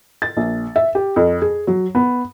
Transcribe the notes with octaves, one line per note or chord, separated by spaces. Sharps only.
A6
A#1
E5
G4
F2
G#4
F#3
B3